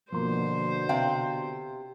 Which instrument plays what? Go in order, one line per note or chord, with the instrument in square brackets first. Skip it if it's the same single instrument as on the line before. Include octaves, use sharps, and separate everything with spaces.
[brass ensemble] B2 D3 [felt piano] F3 A#3 C6 [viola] C5
[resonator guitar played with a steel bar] C3 F5 G5 [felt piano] E5 C6